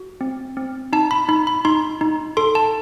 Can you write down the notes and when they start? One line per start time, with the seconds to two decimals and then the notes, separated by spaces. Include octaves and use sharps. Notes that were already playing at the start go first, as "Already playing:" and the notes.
Already playing: F#4
0.21 C4
0.57 C4
0.93 D#4 A5
1.11 B5
1.29 D#4 B5
1.47 B5
1.65 D#4 C6
2.01 D#4
2.37 A4 C6
2.55 A5